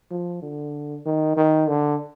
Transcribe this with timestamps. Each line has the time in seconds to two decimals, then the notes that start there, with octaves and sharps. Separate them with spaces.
0.11 F3
0.42 D3
1.06 D#3
1.37 D#3
1.68 D3